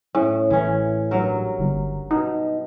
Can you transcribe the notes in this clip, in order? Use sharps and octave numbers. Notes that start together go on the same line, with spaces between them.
A2 C#4
A1 E3 C#4
G2 F#3 A#4
G1
B2 D#4